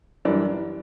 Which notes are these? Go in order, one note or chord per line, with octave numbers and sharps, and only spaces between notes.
F#2 E3 G3 D4